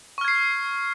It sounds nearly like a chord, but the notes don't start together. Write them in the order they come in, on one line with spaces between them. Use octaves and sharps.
C#6 F6 G#6 C7